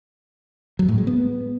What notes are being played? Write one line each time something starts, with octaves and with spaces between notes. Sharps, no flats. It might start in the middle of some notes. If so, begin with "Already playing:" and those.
F#3
A2
G#3
B3